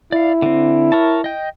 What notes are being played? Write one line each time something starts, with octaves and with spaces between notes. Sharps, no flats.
E4 D5 F5
D3 C4
A#4 C#5 A5
D#5 G5